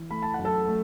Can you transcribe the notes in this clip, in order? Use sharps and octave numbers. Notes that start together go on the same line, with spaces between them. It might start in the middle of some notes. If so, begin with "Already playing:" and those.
Already playing: E3
A3 B5
A5
F#2 F#5
A4 A5
A3